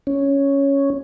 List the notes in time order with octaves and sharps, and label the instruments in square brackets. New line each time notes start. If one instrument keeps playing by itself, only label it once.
[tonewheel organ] C#4